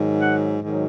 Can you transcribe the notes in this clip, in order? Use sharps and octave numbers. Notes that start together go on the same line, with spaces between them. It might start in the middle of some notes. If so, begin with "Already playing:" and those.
Already playing: G#2 D#3 F#3
F#5
G#2 D#3 F#3